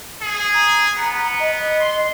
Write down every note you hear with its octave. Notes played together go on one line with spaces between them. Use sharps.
G#4
A#5
B3
D#5
C6